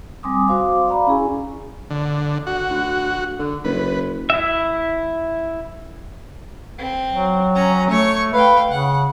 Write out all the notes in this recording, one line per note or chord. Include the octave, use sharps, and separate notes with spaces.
G3 C4 G#5 C6 D6 D#6
F#4 C5 F5 C6 D6
D5 F5 A#5 B5
C#4 E4 G#4 G#5
D3
F#4
D2
D3
F#1 B4
E4 E5
C4
F#3
C#4 A#5
A3 C#5 C#6
B4 F5 G5
C#3 F#5